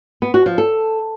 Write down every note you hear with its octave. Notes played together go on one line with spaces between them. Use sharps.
B3
F#4
F3
A4